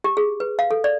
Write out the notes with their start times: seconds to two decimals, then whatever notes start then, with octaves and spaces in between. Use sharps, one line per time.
0.04 G4
0.17 G#4
0.40 B4
0.59 F5
0.71 A4
0.84 D5